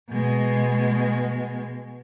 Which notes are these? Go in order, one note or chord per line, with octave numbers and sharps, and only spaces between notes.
B2 G#3